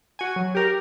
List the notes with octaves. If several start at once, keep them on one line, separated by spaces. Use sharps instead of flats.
F#4 G#5
F#3
G4 A#4